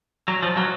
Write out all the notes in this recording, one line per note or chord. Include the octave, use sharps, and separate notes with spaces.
F#3
F3
F#3